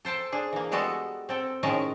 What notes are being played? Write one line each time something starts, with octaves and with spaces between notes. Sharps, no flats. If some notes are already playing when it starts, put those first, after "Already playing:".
A4 C5 G5 A5
D4 G#4
E3 A#3
G3 G#3 B3 F#4 A4
C4 A4 G5
A2 D#3 G#3 C#4 A#4 A5